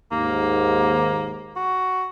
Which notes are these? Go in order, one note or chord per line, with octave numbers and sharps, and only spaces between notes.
D#2 G#2 A#3
F#4